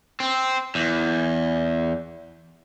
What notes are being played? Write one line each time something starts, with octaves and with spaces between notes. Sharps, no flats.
C4
E2